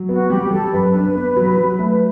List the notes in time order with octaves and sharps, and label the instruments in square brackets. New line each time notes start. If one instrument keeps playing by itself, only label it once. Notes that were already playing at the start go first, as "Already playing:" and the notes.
Already playing: [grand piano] F#3
[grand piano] B3 [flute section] F#4
[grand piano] G3 [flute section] G4
[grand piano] G3 [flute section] A4
[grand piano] F#2 [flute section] B4
[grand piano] D4
B3
F#3
F#3
A3